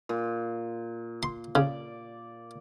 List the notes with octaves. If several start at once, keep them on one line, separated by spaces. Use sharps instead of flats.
A#2
C6
C#3 D5